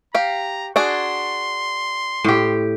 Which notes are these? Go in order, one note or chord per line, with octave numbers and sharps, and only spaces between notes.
G4 F5 A#5
D4 F#4 G#4 C6
A2 G4